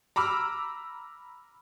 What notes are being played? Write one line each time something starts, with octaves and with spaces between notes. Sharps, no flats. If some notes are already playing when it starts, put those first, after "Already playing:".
A#5 B5 D6 E6 F6